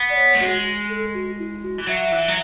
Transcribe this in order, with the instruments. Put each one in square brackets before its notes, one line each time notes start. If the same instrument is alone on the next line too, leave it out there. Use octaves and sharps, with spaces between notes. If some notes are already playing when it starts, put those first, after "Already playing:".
Already playing: [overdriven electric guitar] B3
[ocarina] D5
C#5
[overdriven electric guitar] A3
[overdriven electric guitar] G#3 [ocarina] F#4
[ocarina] A4
F#4
E4
F#4
[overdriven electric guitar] E3
[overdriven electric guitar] F#3 [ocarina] E5
[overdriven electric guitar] E3
F#3